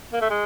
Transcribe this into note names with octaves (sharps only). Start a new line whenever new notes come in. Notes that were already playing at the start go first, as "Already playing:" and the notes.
A#3
A3
G#3